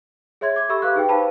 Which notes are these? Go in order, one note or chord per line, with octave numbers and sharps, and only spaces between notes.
G#4 C#5 E5 C6 G#6
D6 G#6
G4 A4 E5 B5 C#6 E6
G4 B4 F5 D6 F#6
D#4 G#4 B4 G5
B4 C5 F5 A5 B5